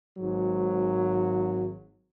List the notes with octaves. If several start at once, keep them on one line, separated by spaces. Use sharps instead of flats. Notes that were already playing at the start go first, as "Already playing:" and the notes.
G#1 G#2 F#3